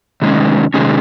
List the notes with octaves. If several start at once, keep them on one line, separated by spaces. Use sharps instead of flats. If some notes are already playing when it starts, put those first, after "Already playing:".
C3 D#3 G#3 C#4
C3 D#3 G#3 C#4